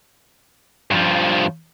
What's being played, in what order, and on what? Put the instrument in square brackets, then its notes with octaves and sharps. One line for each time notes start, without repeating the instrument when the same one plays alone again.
[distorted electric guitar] G2 F3